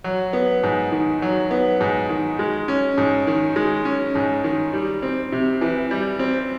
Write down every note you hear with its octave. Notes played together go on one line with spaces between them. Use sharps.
F#3
B3
G#2
D#3
F#3
B3
G#2
D#3
G#3
C#4
G#2
D#3
G#3
C#4
G#2
D#3
G3
C4
C3
E3
G3
C4